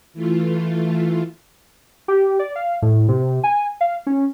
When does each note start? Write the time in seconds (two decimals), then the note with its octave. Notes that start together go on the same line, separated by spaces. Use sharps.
0.14 E3 A3 F4
2.08 G4
2.39 D5
2.56 F5
2.82 A2
3.09 C3
3.44 G#5
3.81 F5
4.07 C#4